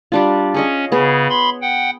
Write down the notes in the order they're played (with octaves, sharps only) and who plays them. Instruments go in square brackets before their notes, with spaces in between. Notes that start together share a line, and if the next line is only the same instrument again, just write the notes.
[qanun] G3 D4 F4
[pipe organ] C#4 [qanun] G#4 C#5 D#5
[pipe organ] C#3 [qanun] B3 G#4
[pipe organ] B5 C6
F#5 G5